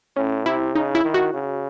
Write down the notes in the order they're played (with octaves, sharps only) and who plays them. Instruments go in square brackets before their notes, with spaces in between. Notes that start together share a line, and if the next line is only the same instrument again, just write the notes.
[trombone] A2 [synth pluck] C#4
[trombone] C3 [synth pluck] E4
[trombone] C#3 [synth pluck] D#4
[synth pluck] E4
[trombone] D#3
[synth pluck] F#4
[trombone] C#3